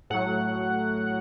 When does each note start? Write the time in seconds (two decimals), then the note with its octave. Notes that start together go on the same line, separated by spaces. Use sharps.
0.10 A2 F#3 F#5